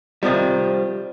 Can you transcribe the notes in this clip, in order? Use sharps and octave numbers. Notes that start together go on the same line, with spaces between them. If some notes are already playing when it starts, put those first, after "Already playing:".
C3 D#3 F3 G3